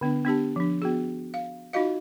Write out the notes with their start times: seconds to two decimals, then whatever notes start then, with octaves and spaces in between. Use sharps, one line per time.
0.01 D3 B3 D4
0.25 B3 D4 G4 A5
0.56 F3 D4
0.82 B3 F#4 G#4
1.34 F5
1.73 D#4 F4 F#4 D#5 F5